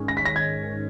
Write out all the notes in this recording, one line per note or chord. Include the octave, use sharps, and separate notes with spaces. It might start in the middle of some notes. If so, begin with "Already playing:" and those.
Already playing: G#2 D#3 G#3 C#4
A#6
B6
A#6
G#6